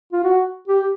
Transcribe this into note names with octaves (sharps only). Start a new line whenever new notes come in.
F4
F#4
G4